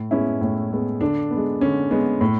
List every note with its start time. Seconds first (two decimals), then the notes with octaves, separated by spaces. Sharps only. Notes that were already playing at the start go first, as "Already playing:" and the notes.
Already playing: A2
0.11 G#3 B3 C#4 E4
0.41 A2
0.72 G#3 B3
1.01 D3 D4
1.31 B3
1.36 G#3
1.61 D3 C#4
1.91 G#3 B3
2.21 A2